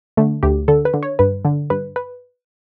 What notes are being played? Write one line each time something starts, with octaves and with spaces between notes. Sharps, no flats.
D3 A3
D2 G4
D3 A4
B4
D3
C#5
G2 B4
D3
G2 B4
B4